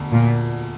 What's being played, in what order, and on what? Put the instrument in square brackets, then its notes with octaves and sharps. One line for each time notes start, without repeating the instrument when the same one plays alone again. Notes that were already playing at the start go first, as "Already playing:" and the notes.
Already playing: [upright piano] E1 D2 D3
[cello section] A#2